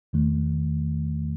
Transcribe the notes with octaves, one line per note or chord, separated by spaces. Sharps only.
E2 D#3 A3